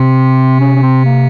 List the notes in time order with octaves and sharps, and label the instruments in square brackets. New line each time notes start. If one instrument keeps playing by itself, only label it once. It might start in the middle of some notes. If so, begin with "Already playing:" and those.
Already playing: [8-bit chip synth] C3 [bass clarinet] C4
[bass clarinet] C#4
C#4
C4
A#3